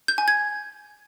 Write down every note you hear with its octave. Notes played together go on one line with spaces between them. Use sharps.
G6
G#5
G#6